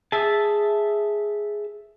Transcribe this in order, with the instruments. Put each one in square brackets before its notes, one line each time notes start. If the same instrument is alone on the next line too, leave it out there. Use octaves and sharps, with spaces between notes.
[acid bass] G#4 [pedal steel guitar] E5 A5